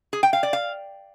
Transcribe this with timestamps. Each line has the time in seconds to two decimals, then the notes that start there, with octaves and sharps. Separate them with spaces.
0.13 G#4
0.23 G5
0.33 F5
0.43 D5
0.53 F5